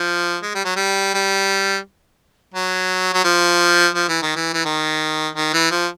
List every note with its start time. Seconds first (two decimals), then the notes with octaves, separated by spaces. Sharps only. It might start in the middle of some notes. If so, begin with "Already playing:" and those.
Already playing: F3
0.43 G#3
0.55 G3
0.65 F#3
0.76 G3
1.14 G3
2.55 F#3
3.14 F#3
3.24 F3
3.95 F3
4.08 E3
4.23 D#3
4.36 E3
4.54 E3
4.65 D#3
5.36 D#3
5.54 E3
5.71 F3